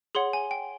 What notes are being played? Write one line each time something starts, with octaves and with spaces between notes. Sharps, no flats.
G#4 C#5 F#5 C6
G#5
G5